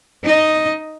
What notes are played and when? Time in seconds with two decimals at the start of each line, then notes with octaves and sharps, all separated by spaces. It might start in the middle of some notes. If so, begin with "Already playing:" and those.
0.23 D#4 D#5